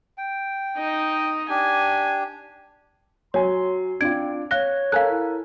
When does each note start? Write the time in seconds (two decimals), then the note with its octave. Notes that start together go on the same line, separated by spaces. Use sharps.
0.18 G5
0.78 D#4 D#5
1.49 D4 G4 G#5
3.34 F#3 C#5 G#5 C6
4.01 C4 D4 F4 G#6 D7
4.51 C#5 F5 F#6 A#6 G7
4.92 A4 A#4 F5 G#5 F#6
5.10 E4